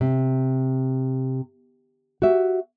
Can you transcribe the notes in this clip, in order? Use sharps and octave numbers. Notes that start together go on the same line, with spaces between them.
C3
F#4 G4 E5